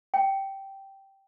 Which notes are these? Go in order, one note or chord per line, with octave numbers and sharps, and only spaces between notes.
G5